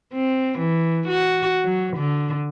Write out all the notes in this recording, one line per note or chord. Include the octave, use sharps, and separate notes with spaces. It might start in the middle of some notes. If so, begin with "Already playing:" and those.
C4
E3
F#4
F#3
D3